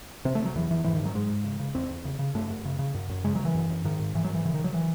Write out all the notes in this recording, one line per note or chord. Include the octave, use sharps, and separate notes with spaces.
C3 C4
A3
C3
F#3
E2 E3
E2 E3
G#2 E3
D#3
G#2
F#3
G#2 G#3
G#2
C#3
C#3
E2 C4
E2
C#3
C#3
F#2 A3
F#2
C#3
C#3
F#2
F#2
C#3 G#3
F#3
C#3
E3
F#2
F#2
G#2 D#3
G#2
G#2 E3
F#3
G#2 E3
C#3 E3
D#3
C#3 F#3
E3